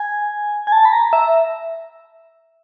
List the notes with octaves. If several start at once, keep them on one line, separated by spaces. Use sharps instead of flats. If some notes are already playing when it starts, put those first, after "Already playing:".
Already playing: G#5
G#5
A5
B5
A#5
E5